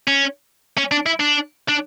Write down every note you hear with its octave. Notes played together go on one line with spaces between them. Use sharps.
C#4
C#4
D4
E4
D4
D4